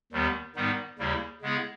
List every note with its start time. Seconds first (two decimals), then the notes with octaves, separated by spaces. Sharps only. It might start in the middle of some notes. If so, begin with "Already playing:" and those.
0.12 D#2 D#3 G3 B3
0.56 G#2 D#3 G3 B3 D#4
0.99 D#2 C#3 G3 A#3 E4
1.42 C#3 G#3 B3 E4 G#4